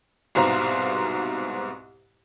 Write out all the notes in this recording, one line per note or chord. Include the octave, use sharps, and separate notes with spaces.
C2 G#2 B2 C5 F5 A#5